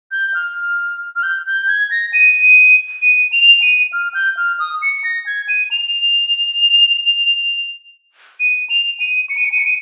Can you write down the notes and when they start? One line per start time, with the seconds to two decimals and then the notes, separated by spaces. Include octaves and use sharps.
0.11 G6
0.34 F6
1.16 F6
1.23 G6
1.46 G6
1.68 G#6
1.91 A#6
2.13 D#7
3.02 D#7
3.32 F7
3.62 D#7
3.93 F6
4.14 G6
4.37 F6
4.59 D#6
4.82 C#7
5.04 A#6
5.26 G#6
5.49 D#7
5.71 F7
8.40 D#7
8.70 F7
9.00 D#7
9.30 C#7
9.37 D#7
9.45 C#7
9.52 D#7
9.59 C#7
9.66 D#7